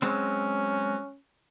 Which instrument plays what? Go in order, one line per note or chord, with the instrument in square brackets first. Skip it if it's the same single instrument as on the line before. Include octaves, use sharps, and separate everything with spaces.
[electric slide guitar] F#3 G#3 C4 [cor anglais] C#4